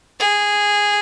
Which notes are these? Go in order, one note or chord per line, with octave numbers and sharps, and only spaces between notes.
G#4